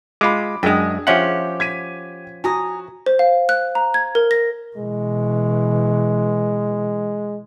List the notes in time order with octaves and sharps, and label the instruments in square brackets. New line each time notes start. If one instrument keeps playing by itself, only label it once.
[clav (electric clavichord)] G#3 F4 [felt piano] B5 D6
[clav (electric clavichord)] F#2 G#3 [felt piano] D4 G#4 [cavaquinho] G5 D#6
[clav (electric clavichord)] F3 C#4 F#5 [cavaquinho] G4 E5 C6
[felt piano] G#6 B6 D#7
[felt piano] F#4 [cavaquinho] G#5 A#5 D#6
[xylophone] C5
F5
F#6
A#5
G#6
A#4
A#6
[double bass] B2 E3 [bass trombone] G#3